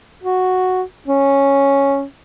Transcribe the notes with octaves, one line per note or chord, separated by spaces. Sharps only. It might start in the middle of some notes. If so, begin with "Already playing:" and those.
F#4
C#4